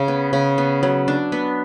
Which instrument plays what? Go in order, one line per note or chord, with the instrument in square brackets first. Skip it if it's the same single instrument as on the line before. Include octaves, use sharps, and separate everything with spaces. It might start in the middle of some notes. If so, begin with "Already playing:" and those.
Already playing: [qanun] C#3
B3
C#3
B3
F#3
D4
B3